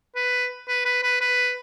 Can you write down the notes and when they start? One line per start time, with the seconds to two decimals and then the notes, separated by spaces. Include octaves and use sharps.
0.15 B4
0.68 B4
0.85 B4
1.03 B4
1.21 B4